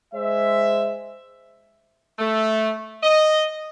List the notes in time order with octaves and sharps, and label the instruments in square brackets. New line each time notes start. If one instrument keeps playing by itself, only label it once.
[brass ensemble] G#3 C5 E5
[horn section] A3
D#5